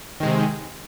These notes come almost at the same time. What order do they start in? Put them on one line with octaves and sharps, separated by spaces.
D#3 G#3 C3